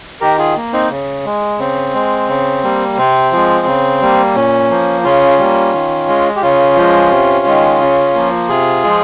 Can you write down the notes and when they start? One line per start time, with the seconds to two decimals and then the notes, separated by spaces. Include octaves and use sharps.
0.21 D#3 G4 A#4
0.38 F4 G#4
0.57 A#3
0.73 C4 D#4
0.91 C#3
1.25 G#3
1.59 C#3 C4
1.94 G#3
2.28 C#3
2.64 G3 A#3
2.98 C3 C4
3.32 F3 G#3
3.67 C#3
4.01 G3 A#3
4.35 A#2 C#4
4.70 F3 A#3
5.04 C#3 C#4 F4
5.39 G3 A#3
5.74 D#3
6.08 G#3
6.36 G4
6.42 C#3 C#4 F4
6.76 F3 G#3
7.11 C3
7.46 D#3 G#3
7.80 C#3
8.15 F3 A#3
8.49 C3 F4 G#4
8.84 F3 G#3